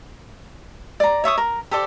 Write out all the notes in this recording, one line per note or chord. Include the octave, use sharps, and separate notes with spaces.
D5 A#5
C#5 E5 C#6 D#6
A#4
G4 A4 C5 D5